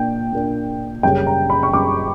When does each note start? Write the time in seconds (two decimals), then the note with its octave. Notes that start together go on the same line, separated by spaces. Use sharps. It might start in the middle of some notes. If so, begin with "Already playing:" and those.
Already playing: A#2 A#3 D4 G5
0.33 A#2 A#3 D4
1.03 F#2 C#3 G3 C#4 G5
1.27 A#5
1.50 B5
1.63 C#6
1.73 F#2 C#3 G3 C#4 D6